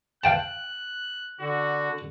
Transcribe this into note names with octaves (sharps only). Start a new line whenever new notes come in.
F5 G5 A5 F#6
D3 F#4